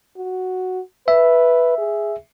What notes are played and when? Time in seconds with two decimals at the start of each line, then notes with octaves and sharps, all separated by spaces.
0.17 F#4
1.08 B4 E5
1.78 G#4